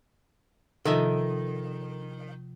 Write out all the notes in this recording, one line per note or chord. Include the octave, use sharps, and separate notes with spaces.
C3 D#3 F3 F4 A4 D#5 E5